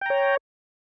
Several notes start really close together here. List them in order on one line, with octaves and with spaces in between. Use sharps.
G5 A#5 C#5